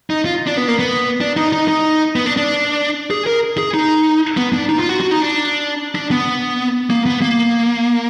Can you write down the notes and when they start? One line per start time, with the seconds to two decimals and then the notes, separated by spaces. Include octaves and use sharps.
0.10 D#4
0.26 F4
0.47 D4
0.57 B3
0.68 A#3
0.79 B3
1.21 D4
1.36 D#4
1.52 D#4
1.68 D#4
2.16 B3
2.26 D4
2.37 D4
3.10 G#4
3.26 A#4
3.58 G#4
3.74 D#4
4.37 B3
4.53 D4
4.69 D#4
4.79 F4
4.89 F#4
5.00 F#4
5.11 D#4
5.22 D4
5.95 D4
6.11 B3
6.90 A#3
7.06 B3
7.22 A#3